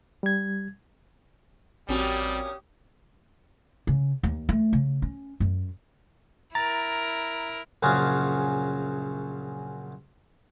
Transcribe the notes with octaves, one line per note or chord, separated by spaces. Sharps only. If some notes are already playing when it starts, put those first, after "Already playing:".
G3 G#6
A1 A#2 G3 C4 C#4 F#4 G4 D#6
C#3
D#2
A3
C#3
C#4
F#2
E4 A#4 A#5 A6
A#1 F#2 C#3 F4 F#4 G#4